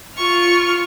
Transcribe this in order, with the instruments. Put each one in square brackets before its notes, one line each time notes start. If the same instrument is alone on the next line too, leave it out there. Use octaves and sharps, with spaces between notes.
[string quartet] F4 C#6 F6